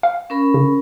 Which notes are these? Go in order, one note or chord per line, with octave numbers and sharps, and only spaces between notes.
F5
C#4 A#4 B5
C#3